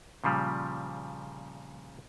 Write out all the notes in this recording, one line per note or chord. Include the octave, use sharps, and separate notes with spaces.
A#2 C#3 F3 G3